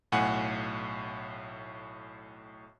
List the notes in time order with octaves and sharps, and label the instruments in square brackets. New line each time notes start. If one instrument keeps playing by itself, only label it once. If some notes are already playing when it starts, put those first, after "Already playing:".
[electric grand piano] B1 A2 F5 F#5 G#5